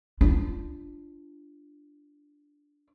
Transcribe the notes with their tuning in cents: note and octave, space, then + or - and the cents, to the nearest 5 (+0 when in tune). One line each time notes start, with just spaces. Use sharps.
D4 -5 F4 -30